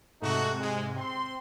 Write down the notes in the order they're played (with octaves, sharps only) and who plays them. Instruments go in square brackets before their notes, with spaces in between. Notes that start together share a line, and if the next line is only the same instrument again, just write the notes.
[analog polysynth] G#2 C3 [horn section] A3 D#4 F#4
[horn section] G#3
C4 C6